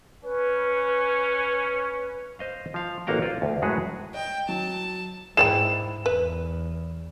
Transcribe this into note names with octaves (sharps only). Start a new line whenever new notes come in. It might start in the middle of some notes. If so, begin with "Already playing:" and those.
C#4 B4
C5 D#5 F5
F3 F5
A1 A#3 F#4 F5 G5 A#5
F4 C5 D5
D2
F#2 A2 G#3 F#4 G#4 B4
D#5 G5
F#3 A5
G#2 E4 G#4 D5 G5 E7
E2 B4